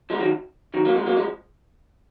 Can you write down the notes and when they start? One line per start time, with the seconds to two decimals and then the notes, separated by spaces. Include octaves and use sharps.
0.10 F3 G#3
0.20 D#3 F#3
0.74 D#3 F#3
0.85 F#3 A#3
0.96 F3 G#3
1.06 F#3 A#3
1.17 F3 G#3